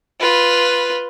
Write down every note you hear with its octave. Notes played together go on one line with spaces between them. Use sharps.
F4 B4